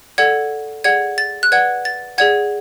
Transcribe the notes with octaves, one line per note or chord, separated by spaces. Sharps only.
A4 D5 F#5 G#6
G#4 D5 F#5 G#6
A6
F#6
B4 D5 F#5 G#6
A6
G#4 D5 F#5 G#6